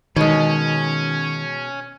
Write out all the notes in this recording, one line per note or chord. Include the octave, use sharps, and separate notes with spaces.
B2 D#3 G#3 C#4